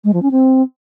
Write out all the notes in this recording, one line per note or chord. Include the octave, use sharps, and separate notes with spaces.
G#3
F3
C#4
C4